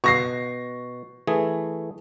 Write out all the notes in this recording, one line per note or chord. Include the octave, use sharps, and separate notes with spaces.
B2 C#6 A#6 C7
E3 A3 G#4